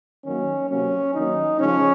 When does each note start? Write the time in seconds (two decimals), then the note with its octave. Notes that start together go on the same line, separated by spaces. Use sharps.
0.25 D#3 F#3 A#3 C#4
0.70 C3 F#3 A#3 C#4
1.15 D#3 F#3 A#3 D#4
1.59 C#3 F3 G#3 C#4